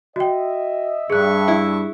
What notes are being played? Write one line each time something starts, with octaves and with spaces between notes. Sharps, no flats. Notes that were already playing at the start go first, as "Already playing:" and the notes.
F#4 D#5 E5 G5
G2 G#4 E5 C#6 F#6
E4